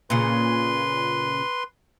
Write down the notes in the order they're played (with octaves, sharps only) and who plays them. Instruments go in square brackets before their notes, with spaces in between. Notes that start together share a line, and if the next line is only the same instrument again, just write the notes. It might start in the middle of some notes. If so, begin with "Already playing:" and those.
[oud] A#2 C#3 [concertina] B4 C6